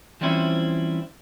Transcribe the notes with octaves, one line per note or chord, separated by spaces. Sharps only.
E3 F3 G3 C4 C#4 E4